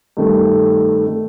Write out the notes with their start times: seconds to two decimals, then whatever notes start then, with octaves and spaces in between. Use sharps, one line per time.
0.17 G2 D#3 A3
1.07 D#3 A3